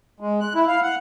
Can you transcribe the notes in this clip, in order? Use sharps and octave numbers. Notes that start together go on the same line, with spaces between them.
G#3
F#6
E4
F5
F#5